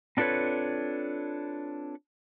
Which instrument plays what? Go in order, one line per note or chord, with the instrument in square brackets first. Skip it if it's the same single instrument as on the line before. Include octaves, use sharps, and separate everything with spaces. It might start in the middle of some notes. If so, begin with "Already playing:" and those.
[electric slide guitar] C4 D4 F4 A4 B4 C#5